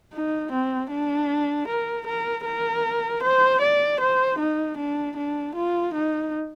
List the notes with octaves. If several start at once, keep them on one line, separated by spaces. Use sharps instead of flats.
D#4
C4
D4
A#4
A#4
A#4
C5
D5
C5
D#4
D4
D4
F4
D#4